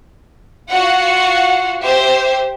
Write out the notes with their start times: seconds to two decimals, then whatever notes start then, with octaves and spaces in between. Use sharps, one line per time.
0.71 F4 F#4 F5 F#5
1.81 G4 C5 E5